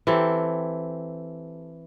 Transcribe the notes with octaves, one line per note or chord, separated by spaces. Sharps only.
E3 C4 G4 A4